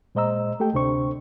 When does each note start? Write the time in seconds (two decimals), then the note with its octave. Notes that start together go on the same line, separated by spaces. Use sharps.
0.15 A#2 G#3 C5 D#5 A#5 E6
0.60 A3 G4 A4 G5
0.73 D2 C3 D4 C5 C#6